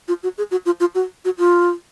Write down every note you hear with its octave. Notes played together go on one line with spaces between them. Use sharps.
F4
F#4
G#4
F#4
F4
F4
F#4
F#4
F4